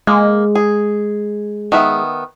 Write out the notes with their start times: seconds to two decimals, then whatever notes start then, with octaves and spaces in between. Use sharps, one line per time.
0.07 G#3 A#3
0.55 G#4
1.72 D#3 B3 E5